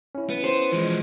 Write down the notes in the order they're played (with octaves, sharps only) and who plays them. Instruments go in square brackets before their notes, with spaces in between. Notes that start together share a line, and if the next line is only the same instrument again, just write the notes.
[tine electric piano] C#4 E4
[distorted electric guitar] B3
[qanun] C5
[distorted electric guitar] E3 G#3 [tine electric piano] F3